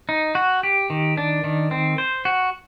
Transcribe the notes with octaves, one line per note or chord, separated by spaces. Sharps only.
D#4
F#4
G4
D#3
D4
D#3
C4
C5
F#4